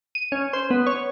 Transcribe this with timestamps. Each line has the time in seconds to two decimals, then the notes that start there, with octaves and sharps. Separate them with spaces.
0.15 D#7
0.32 C#4
0.53 C5
0.70 B3
0.87 C#5